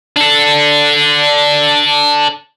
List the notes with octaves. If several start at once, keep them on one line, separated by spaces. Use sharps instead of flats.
D4 A4